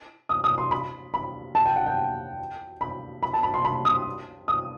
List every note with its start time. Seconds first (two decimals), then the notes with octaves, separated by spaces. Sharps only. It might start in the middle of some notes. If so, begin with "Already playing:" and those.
0.29 D#6
0.44 D#6
0.58 C6
0.71 B5
1.14 B5
1.55 A5
1.66 G5
1.76 F#5
1.86 G5
2.81 B5
3.23 B5
3.34 A5
3.43 B5
3.54 C6
3.65 B5
3.85 D#6
4.48 D#6